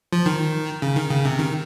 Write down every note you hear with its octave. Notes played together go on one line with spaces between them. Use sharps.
F3
D#3
C#3
D#3
C#3
C3
D#3